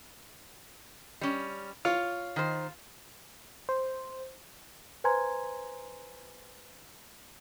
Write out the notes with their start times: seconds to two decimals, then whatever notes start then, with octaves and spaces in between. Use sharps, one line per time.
1.21 G3 C#4
1.85 F4 C#5
2.36 D#3 C5
3.69 C5
5.04 B4 C5 G#5 A#5 C6 G#6